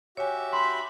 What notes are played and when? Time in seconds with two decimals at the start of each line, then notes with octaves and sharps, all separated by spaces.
0.17 F#4 G4 C#5 E5 G#5
0.53 B5 C6